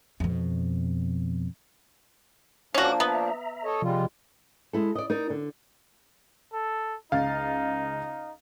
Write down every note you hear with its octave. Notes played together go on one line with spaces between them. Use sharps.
F2 B2
F3 A#3 C#4 D4 F#4 D6
B3 E5 A#5
A4 C#5 D#5
C3 F3 G3 G#3 F4
G#3 E4 A4
D5 D#5
D#4 A#4 D5
D3
A4
C#2 D#4 F5 A6